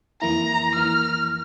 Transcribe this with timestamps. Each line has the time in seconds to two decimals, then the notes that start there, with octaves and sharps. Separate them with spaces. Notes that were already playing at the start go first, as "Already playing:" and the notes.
0.22 F2 E3 A#3 E4 A#5
0.75 F2 E3 A#3 E4 F6